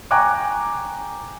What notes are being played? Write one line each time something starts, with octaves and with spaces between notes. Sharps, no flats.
G5 G#5 A#5 C#6 D6 F#6